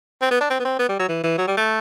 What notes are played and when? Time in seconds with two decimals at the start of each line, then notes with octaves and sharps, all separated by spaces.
0.22 C4
0.31 B3
0.41 D4
0.50 C4
0.60 B3
0.65 C4
0.79 B3
0.89 G3
0.99 F#3
1.09 E3
1.24 E3
1.38 F#3
1.48 G3
1.57 A3